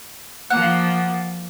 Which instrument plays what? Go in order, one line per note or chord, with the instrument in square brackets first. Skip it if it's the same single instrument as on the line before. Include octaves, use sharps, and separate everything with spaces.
[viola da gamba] F3 A#3 [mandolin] F#5